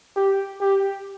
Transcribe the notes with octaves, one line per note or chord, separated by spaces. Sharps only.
G4
G4